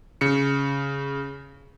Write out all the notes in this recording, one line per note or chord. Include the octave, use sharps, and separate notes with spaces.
C#3 C#7